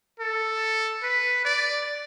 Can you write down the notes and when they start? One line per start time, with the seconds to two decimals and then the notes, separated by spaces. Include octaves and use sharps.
0.20 A4
1.03 B4
1.45 D5